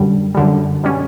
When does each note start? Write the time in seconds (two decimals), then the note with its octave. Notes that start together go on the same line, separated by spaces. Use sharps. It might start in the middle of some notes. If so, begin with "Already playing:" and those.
Already playing: F#2 D3 G3
0.35 F#2 D3 G3
0.83 B2 G3 C#4